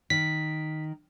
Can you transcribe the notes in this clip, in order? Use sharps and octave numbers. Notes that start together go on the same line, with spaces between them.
D#3 B6